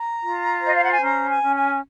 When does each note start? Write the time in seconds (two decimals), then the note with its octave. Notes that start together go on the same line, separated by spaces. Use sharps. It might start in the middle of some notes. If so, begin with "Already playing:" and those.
Already playing: A#5
0.21 F4
0.61 C5 D#5
0.75 F5
0.84 F#5
0.92 G#5
1.01 C#4 A#5
1.29 G#5
1.42 C#4
1.55 G#5